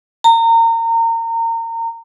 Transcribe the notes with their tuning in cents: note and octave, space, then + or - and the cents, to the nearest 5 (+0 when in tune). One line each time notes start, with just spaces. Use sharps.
A#5 -30